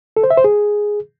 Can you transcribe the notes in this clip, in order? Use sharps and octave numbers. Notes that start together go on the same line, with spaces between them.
A4
C5
E5
C5
G#4